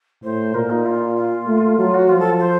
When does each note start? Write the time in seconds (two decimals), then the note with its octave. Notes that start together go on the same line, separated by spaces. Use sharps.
0.23 A2 C5
0.54 A#2 A#4
0.70 D#4
0.86 F4
1.16 F4
1.47 A3
1.78 F#3 F4
1.94 F#4
2.09 F3 F4
2.19 A4
2.39 C5